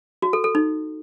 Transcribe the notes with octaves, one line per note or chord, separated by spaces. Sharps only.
F#4
A4
A4
D#4